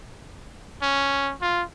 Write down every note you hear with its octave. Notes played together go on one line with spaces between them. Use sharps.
C#4
F4